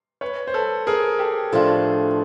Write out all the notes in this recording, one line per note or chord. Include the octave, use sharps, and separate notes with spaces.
B4 C#5
C5
A4 B4
G#4 A#4
G4 A4
A2 F3 A3 D4 F4